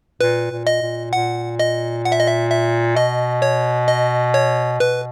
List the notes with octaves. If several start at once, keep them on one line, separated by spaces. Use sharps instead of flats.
A#2 B4
A#2
D#5
A#2
A#2 F#5
D#5
F#5
E5
D#5
E5
E5
B2 D#5
C#5
D#5
C#5
B2 B4